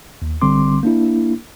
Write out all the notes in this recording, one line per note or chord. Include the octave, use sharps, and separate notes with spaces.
D#2
A1 D3 G3 C4 C6 D6
A#3 D4 E4